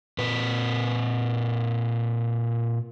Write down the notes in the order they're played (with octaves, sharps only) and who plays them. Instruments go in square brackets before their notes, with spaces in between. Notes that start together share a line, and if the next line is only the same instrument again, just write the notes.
[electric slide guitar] A#2 B4